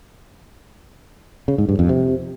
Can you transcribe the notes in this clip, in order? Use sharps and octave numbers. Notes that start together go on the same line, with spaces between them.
C#3
G#2
G2
F2
C3